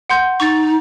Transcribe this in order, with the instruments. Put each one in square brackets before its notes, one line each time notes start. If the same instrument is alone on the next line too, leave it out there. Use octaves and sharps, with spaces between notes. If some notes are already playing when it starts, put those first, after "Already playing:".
[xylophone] F#5 C6 G6
[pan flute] D#4 [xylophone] C#6 A6